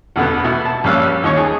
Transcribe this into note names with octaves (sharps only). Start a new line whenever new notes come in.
E2 B2 D3 B3
B2 E4 F#4
A5
A#1 G3 C#4 F5 E6 F#6
D#2 F3 D#4 C#5 C#6 D#6
G#4